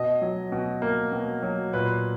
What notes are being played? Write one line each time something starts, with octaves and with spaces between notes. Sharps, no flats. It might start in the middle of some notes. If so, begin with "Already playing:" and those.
Already playing: B2 D#5
F#3
B2
A#3
B2
F#3
A#2 B4